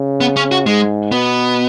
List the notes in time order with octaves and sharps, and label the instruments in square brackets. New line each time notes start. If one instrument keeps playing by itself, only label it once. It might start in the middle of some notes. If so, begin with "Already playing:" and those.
Already playing: [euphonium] C#3
[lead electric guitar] B3
C#4
F#4
[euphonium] G#2 [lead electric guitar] G#3
[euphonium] B2 [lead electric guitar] B3